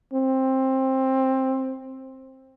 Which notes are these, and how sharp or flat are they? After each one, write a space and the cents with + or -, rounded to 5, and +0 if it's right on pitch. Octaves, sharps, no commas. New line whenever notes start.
C4 +15